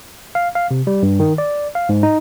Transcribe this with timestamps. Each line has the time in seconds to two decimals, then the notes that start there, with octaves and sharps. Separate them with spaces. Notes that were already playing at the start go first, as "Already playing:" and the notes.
0.35 F5
0.55 F5
0.71 C3
0.87 G3
1.03 G2
1.20 D#3
1.38 D5
1.75 F5
1.89 G#2
2.03 D#4